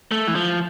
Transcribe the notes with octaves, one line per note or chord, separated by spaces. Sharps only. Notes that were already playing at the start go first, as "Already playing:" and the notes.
A3
E3
F3